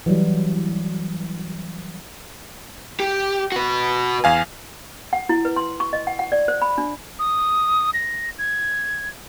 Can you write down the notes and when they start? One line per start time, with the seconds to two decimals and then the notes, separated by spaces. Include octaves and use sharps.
0.06 E3 F#3 G3
3.00 G4
3.52 F#4 B4
4.24 E2 F5 G#5
5.13 F#5
5.29 E4
5.45 B4
5.56 C6
5.80 C#6
5.93 D#5
6.07 F#5
6.19 F#5
6.32 D5
6.48 C5
6.62 B5
6.78 D4
7.19 D#6
7.94 A#6
8.38 G#6